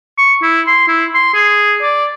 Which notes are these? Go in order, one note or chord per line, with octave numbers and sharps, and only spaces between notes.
C#6
E4
C6
E4
C6
G#4
D5